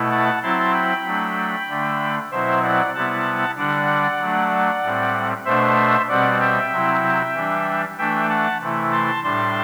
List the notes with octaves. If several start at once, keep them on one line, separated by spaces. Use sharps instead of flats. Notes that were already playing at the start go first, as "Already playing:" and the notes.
Already playing: B2 A3 E4
F#5 A5
F#3 C4 E4 A5 C6
G5 B5
F#3 A3 D4
D3 A3 D4
B2 F#3 C4 E4 C5 E5
D5 F#5
C3 G3 B3 E4 F#5 A5
D3 G3 D4 D5 F#5
F#3 A3 D4
A2 G3 C4
B2 A3 D4 C5 E5
B2 G3 C4 D5 F#5
E5 G5
C3 F#3 C4 E4
E3 G3 D4
E3 A3 D4 E5 G5
F#5 A5
C3 E3 A3 E4
A5 C6
A2 G3 D4 A5 C6